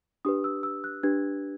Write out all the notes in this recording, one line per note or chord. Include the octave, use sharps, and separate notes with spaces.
D4 G4 B4 D#6
E6
E6
F#6
D4 G4 B4 G#6